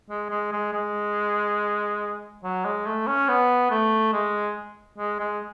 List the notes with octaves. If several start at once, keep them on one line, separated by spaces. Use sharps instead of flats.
G#3
G#3
G#3
G#3
F#3
G#3
A3
C#4
B3
A3
G#3
G#3
G#3